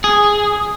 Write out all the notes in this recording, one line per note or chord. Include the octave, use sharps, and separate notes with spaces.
G#4